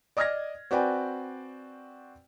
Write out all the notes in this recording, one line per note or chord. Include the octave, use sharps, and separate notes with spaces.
D5 D#5 D#6 F6 G#6 A#6
C4 F#4 B4 D5 G5 G#5